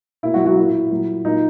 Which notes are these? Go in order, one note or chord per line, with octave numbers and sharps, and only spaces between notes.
B2 A#3 E4
F#3 F#4
F#3 F#4
A#2 A#3 E4
A#2 F#3 A#3
A#2 F#3 A#3 D#4